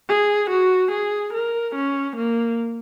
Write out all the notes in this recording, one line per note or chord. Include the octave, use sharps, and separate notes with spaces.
G#4
F#4
G#4
A#4
C#4
A#3